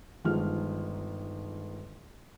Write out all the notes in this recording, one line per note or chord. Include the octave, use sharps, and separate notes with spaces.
G1 D#3 F3 G#3 F6